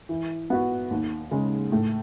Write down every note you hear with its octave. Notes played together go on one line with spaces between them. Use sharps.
E3
B3 F#4
D#2
C#3 G#3
A2